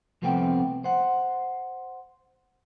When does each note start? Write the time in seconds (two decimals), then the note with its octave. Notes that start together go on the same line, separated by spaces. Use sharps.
0.22 C2 F3 A3 B3 C4 G5
0.84 C5 F#5